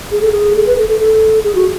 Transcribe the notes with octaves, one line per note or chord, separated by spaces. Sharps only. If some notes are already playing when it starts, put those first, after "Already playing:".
G#4
A4
G#4
A4
B4
A4
A4
A4
G#4
F#4